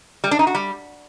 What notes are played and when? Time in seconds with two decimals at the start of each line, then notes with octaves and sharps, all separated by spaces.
0.24 G3
0.31 D4
0.39 D#4
0.47 F#4
0.55 G3